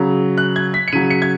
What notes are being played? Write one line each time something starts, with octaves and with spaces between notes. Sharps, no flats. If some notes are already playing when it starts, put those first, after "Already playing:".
Already playing: C#3 F#3
F#6
G#6
B6
C#7
C#3 F#3 D#7
C#7
G#6